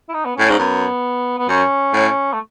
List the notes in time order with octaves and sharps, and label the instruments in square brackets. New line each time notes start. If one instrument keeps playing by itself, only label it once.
[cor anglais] E4
D#4
B3
[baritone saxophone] A2 [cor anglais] C#4
[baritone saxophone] G#2
[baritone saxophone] F#2 [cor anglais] B3
[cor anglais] B3
[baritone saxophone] F#2 [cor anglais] C#4
[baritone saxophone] A2
[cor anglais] A3